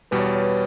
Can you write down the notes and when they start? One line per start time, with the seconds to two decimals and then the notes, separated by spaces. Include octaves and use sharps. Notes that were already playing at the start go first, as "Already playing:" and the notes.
0.11 E2 B2 G3 B4
0.19 C#5
0.28 B4
0.36 C#5
0.43 B4